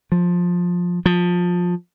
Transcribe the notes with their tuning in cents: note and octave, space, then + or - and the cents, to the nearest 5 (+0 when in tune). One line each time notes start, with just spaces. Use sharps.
F3 +15
F3 +20